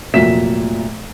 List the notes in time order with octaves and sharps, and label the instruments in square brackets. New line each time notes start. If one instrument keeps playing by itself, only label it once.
[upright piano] F1 A#2 F#3 E5 B6 E7